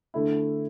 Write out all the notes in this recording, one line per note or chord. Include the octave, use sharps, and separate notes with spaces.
D3 A3 E4